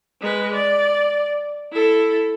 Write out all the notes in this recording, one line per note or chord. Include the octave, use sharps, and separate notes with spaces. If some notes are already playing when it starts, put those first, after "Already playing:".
G#3 B4
D5
E4 A4